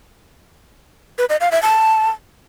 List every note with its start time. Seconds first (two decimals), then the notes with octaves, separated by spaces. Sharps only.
1.18 B4
1.29 D#5
1.41 F5
1.52 E5
1.63 A5